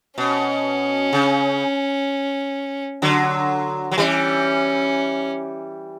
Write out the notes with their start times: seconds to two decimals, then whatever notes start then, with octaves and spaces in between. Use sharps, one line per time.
0.18 B2 C#4
1.13 C#3
3.02 D3 F#3
3.92 F#3
3.97 E3 G3 C#4